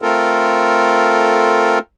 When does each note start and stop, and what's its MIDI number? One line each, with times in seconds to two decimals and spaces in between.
0.02 1.79 57
0.02 1.79 60
0.02 1.79 65
0.02 1.79 69
0.02 1.79 70